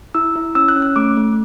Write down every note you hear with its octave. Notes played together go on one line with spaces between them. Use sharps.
E4 E6
E4
C#4 E6
F#6
C#4
F#6
A3 D6
A3